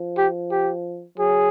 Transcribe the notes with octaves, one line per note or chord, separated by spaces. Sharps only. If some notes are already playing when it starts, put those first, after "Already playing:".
Already playing: F3
G4
G4
F#3 G#4